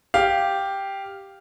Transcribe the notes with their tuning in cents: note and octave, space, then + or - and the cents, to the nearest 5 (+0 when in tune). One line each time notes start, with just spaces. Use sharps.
G4 +0 F5 +0